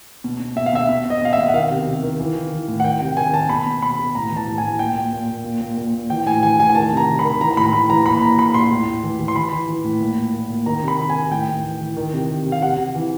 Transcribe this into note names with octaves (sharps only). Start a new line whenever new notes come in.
B2
B2
B2 E5
F5
B2 E5
B2
B2 D#5
B2 F5
B2 E5
F#5
D#3 F5
C3
C3
D#3
E3
E3
E3
A2
F#5
D#3 G5
C3 G5
D#3 G#5
D#3 A5
B2 B5
B2
B2 B5
B2
A2 A#5
E3
A5
A2
G#5
A2
A#2 G5
A#2
A#2
A#2
A#2
A#2
A#2
A#2
E3 G5
A2 G#5
E3 G#5
A2 G#5
G#5
D#3 A5
C3 A#5
C3
B5
D#3
E3 A#5
A#5
A2 B5
A2 B5
E3 A#5
A#2 B5
A#2 A#5
A#2 B5
A#2 C6
A2
A2
E3
E3
C6
E3 B5
E3
E3
A2
A#2
A#2
A#2
A#2
D#3 A#5
C3
B5
D#3
G#5
D#3
A2 G5
A2
E3
E3
D#3
C3
C3
C3
F5
C3 F#5
C3
E3